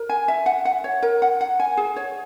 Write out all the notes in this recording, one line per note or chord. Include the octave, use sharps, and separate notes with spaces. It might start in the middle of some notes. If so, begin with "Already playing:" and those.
Already playing: A#4
G#5
E5
F#5
F#5
C#5
A#4
F#5
F#5
G#5
G#4
C#5